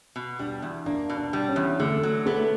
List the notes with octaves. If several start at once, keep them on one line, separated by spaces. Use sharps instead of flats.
B2
G3 D4
E2
A#3 D4
B2
D4
G3
C#4
E2
D3 A3
F#3
A3 B3